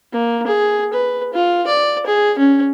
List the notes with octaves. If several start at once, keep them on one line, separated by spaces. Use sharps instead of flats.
A#3
G#4
B4
F4
D5
G#4
C#4